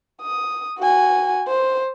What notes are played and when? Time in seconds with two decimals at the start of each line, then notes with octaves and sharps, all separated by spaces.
0.22 D#6
0.79 F#4 G#5
1.47 C5